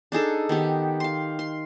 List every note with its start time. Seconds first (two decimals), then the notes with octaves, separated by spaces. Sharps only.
0.12 D4 D#4 G#4 A4
0.49 D#3 B3 G4
1.00 F5 C6
1.39 C6